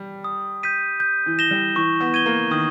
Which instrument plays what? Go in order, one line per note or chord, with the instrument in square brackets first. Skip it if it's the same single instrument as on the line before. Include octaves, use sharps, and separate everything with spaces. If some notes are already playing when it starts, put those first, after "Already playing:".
Already playing: [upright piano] G3
[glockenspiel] D#6
G6 B6 D#7
G6
[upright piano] E3
[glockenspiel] A#6 E7 G7
[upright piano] G3
[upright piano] E3 [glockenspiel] C#6
[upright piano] B3
[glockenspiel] G#6 D#7 G7
[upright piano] A#3
[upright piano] D#3 [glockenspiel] D#6